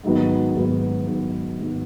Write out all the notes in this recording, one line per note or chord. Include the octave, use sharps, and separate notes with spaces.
G#2 D#3 F#3 B3
G#2 D#3 F#3 B3
G#2 D#3 F#3 B3
G#2 D#3 F#3 B3